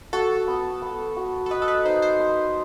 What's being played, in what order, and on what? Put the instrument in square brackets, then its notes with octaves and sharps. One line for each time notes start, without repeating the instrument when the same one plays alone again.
[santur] F#4 [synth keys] A4
[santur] B3
B3
F#4
[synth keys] A4
[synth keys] B4 [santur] D#5
[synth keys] A4
B4
[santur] D#4 [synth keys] C5
[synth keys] C5
[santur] B4